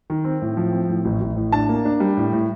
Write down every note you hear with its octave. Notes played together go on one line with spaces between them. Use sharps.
D#3
C4
A2
F3
C4
A2
A1
A1
A2
D4 A5
A#3
D4
G3
A2
A2